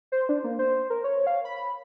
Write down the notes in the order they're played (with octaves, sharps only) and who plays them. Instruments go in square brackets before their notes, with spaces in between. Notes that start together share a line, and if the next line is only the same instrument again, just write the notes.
[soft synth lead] C5
D4
A#3
C5
A#4
C#5
F5
B5